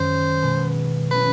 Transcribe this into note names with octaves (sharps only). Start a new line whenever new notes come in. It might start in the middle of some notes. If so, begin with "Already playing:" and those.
Already playing: F#2 D#3 G#3 C5
B2 G#3 B3
D#3 F#3 A3 C#4 E4 B4